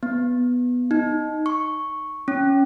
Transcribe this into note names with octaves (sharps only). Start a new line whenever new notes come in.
B3
D#4
C#6
C#4